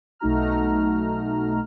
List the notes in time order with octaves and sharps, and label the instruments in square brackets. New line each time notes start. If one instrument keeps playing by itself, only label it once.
[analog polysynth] B1 A3 D#4 F#4 A#5 F6